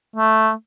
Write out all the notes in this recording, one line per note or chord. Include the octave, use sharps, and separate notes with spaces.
A3